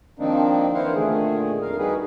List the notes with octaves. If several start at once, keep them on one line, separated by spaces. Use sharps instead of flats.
D#3 F3 A#3 C4 D4 D#4
E3 E4 A#4 C5 F5 F#5
A#2 D3 D#3 A3 G#4
F2 A#4 F5
G3 D#4 F#4 G#4 B4